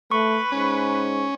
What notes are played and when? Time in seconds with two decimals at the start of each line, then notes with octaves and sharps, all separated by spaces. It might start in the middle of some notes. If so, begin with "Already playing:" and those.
0.12 A3 B4 C#6
0.52 G#2 C#4